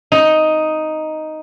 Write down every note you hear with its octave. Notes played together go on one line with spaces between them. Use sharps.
D#4